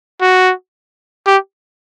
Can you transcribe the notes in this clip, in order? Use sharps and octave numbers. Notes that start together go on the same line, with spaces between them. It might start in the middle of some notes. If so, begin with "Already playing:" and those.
F#4
G4